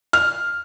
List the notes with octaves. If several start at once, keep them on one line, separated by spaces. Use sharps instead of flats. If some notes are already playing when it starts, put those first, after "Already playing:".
F6